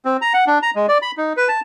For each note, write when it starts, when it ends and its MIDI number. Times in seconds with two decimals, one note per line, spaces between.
0.05 0.17 60
0.22 0.33 82
0.34 0.45 78
0.47 0.58 62
0.62 0.70 82
0.76 0.86 56
0.88 0.98 74
1.02 1.11 83
1.17 1.33 63
1.37 1.48 71
1.48 1.60 81